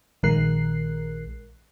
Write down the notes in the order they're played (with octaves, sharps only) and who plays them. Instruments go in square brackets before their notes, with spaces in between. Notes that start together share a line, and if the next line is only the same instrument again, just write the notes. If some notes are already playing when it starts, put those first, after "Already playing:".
[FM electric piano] A#1 D#3 G#3 A#4 F#6 C7